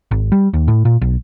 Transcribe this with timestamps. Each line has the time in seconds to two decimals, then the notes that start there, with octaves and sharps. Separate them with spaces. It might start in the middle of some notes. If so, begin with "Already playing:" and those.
0.11 G#1
0.32 G3
0.53 D#2
0.68 A2
0.85 A#2
1.01 B1